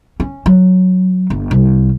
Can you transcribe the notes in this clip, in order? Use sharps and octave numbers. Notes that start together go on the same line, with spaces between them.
C#4
F#3
G1
C2